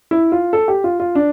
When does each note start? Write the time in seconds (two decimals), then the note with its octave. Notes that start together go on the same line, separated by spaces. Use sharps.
0.11 E4
0.32 F4
0.53 A4
0.68 G4
0.84 F4
1.00 F4
1.15 D4